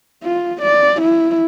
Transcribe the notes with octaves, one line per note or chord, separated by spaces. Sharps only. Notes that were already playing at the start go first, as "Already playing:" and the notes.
F4
D5
E4